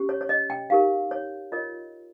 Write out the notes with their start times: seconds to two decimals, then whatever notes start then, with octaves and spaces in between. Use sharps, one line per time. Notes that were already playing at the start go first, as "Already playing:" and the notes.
Already playing: C#4 G4
0.09 C#5
0.21 C#5
0.29 D#5
0.50 G5
0.70 D#4 G4 A#4 F5
1.11 C#5
1.52 F4 A#4 C#5 D#5